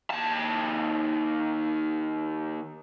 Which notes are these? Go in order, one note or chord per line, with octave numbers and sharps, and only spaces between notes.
D#2 A5